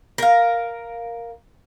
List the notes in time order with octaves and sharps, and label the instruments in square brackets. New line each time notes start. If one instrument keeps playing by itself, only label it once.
[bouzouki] A#4 F5